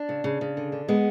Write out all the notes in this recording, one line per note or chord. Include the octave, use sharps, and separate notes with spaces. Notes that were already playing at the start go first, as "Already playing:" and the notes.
Already playing: D4
C#3
C#3
C#3
D3
D3
G#3 B3